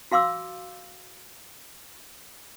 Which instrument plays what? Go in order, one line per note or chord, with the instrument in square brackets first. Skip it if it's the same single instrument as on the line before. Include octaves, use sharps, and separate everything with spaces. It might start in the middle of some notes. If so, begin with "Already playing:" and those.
[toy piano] F#4 F5 C6 D6 E6